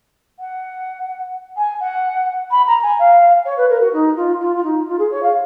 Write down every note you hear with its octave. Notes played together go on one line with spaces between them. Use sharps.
F#5
G#5
F#5
B5
A#5
G#5
F5
C#5
B4
A#4
F#4
D#4
F4
F4
F4
D#4
F4
G#4
C#5
F5